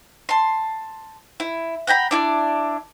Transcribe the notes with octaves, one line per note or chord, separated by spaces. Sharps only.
A5 C6
E4
F#5 G5 A#5 B5
D4 E4 D5